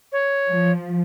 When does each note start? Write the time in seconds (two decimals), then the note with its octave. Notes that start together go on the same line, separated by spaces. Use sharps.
0.12 C#5
0.49 F3